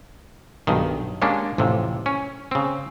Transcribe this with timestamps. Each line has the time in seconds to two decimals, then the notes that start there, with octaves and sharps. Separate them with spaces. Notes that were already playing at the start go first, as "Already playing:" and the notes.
0.67 B1 G2 D#3
1.22 G3 G#3 A#3 C#4 D4
1.58 A1 F2 C3
2.06 C#4
2.51 C#3 C4